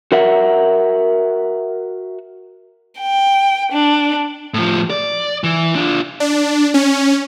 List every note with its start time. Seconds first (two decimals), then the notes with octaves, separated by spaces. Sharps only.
0.12 F#4 A#4 E5 F#5
3.00 G5
3.72 D4
4.54 A2 F3
4.90 D5
5.44 E3
5.75 D4 F4
6.20 D4
6.74 C#4